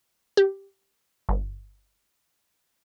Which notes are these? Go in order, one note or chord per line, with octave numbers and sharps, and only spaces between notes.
G4
G1